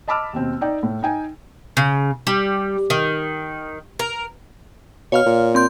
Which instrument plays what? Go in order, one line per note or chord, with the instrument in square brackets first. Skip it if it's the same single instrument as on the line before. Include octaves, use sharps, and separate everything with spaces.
[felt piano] D#5 A5 B5 D6 E6 F6
D#2 B2 C4
D#4 D5 G5
A2
D#4 G5 G#5
[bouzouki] C#3
G3
D#3
A#4
[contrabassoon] B2 [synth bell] C#5 F5 F6
[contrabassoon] A#2
[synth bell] C4 C6 G6